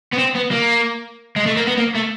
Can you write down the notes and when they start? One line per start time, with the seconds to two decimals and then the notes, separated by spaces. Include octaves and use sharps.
0.13 B3
0.19 C4
0.36 B3
0.51 A#3
1.36 G#3
1.46 A3
1.57 A#3
1.68 B3
1.78 A#3
1.95 A3